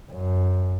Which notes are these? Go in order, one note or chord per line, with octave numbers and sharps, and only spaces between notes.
F#2